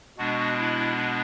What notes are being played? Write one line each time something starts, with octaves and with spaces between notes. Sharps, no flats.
B2 G#3 B3 D4 F#4
E4